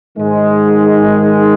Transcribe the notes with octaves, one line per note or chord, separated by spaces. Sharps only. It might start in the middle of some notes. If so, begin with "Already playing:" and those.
G#2 D#3 G#3